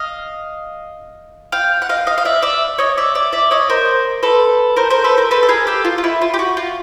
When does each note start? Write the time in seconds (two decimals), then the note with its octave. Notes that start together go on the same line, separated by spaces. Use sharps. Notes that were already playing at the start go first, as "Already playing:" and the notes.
Already playing: D#5 F5
1.52 F5 G5
1.82 F#5
1.89 D#5 F5
2.07 D#5 F5
2.18 F5
2.25 D5 E5
2.42 D5 E5
2.78 C#5 D#5
2.98 D5 E5
3.15 D5 E5
3.33 D5 E5
3.51 C#5 D#5
3.70 A#4 C5
4.23 A4 B4
4.76 A#4 C5
4.90 A#4 C5
5.04 A4 B4
5.18 A#4 C5
5.31 A4 B4
5.43 A4
5.49 G#4 A#4
5.67 G4 A4
5.85 F4
5.98 F4
6.04 E4
6.22 F4
6.34 G4
6.39 F#4
6.57 F4